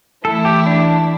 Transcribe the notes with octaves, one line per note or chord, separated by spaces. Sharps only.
E3 A3 E4 A4
G4
D4